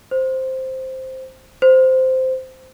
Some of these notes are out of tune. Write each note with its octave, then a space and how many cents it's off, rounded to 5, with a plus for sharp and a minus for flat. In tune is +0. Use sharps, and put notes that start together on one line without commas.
C5 +0
C5 -10